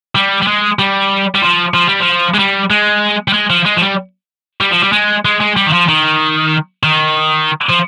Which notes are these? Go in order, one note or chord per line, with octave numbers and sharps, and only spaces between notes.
G3
G3
G#3
G3
G3
F3
F3
G3
F3
G#3
G3
G#3
G3
G#3
F3
G#3
F3
G3
G3
F3
G3
G#3
G#3
G#3
G3
D#3
F3
D#3
D#3
F3